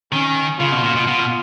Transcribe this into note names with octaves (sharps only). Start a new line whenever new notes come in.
D#3 C#4
C#3 F4
B2
A#2
B2
B2